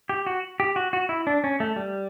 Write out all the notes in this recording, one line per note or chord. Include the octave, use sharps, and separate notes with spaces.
G4
F#4
G4
F#4
F#4
E4
D4
C#4
A3
G3